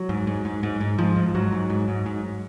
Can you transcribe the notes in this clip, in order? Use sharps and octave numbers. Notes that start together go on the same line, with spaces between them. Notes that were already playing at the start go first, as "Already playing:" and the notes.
Already playing: F#3
G#2
G#2
G#2
G#2
G#2
G#2 F3
G#2
G#2 F#3
G#2
G#2
G#2
G#2